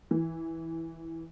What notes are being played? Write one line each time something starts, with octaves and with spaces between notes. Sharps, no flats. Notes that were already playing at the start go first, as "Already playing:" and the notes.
E3